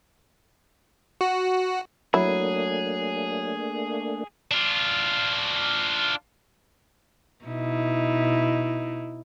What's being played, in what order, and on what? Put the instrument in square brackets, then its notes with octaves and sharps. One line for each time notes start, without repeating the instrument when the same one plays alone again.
[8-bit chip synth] F#4
[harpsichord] F#3 [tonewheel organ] A3 A#3 D4 [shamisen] E4 [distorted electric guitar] G#4
[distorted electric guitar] D4 F4
[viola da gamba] B2 D#4 E4